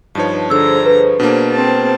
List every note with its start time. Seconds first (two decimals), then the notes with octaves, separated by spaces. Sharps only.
0.15 G2 F3 D#4 B4 C#5 A5
0.50 D3 G#4 C5 A#5 E6
0.86 B4
1.20 B2 A#3 D4
1.52 C4 A5